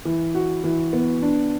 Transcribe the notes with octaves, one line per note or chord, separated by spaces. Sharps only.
E3
F#4
E3
B3
D4